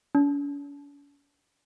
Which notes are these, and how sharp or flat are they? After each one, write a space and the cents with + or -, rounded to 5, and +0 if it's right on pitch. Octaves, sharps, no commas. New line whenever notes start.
C#4 +45